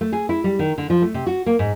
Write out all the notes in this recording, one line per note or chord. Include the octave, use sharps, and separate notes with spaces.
A3
G#4
E4
G3
D#3
D3
F3
A3
C3
F#4
A#3
G#2